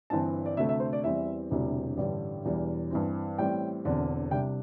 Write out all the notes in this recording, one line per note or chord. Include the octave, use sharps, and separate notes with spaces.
G1 G2 E3 C4 A5
D5
D2 C3 A3 E5
E5
C5
D5
E2 E3 G3 C4 E5
E1 D2 C3 E3 G3
A1 G2 D3 G3 D5
E1 E2 E3 G3
G2 E3 C4
A1 A2 G3 C4 G5
E1 E2 D3 C4
C2 C3 G3 D4 G5